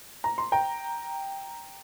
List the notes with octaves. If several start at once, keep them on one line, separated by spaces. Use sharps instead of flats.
A#5
C6
G5 A#5